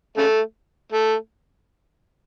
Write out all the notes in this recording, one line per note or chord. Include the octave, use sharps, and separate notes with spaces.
C#3 A3
A3